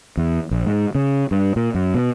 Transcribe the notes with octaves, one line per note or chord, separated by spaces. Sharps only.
E2
A#1
G#2
C#3
G2
A#2
F#2
B2